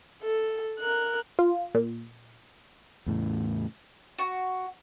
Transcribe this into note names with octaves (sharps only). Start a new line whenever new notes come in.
A4
A#4 F#6
F4
A#2
E2 A2 C#3
F#4